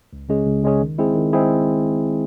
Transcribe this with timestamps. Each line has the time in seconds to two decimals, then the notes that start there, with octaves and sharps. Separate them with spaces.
0.13 C#2
0.29 C#3 G#3 C#4 G#4
0.46 C#2
0.63 C#3 G#3 C#4 G#4
0.81 D#3
0.98 G#3 C4 E4 G#4
1.15 D#3
1.33 G#3 C4 E4 G#4